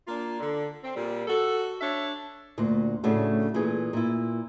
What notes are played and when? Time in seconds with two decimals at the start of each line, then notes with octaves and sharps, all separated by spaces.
0.07 A#3 D4 F4
0.40 D3
0.83 C4
0.96 A#2 G3
1.28 F#4 A4
1.81 D4 C#5 E5
2.58 D2 A#2
3.03 A2 C#3 A3 D4 F#4
3.54 A#2 E3 A3 G#4
3.93 A#2 E4